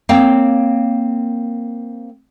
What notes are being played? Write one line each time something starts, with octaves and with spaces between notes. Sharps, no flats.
A#3 C4 C#5 F5 G5